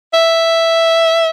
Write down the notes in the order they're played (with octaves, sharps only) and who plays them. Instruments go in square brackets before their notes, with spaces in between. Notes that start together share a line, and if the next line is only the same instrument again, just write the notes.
[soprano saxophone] E5